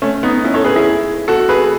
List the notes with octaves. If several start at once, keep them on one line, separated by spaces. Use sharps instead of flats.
A3 C#4
B3 D#4
C#4 E4
A4 C#5
G#4 B4
E4 G#4
F#4 A4
G#4 B4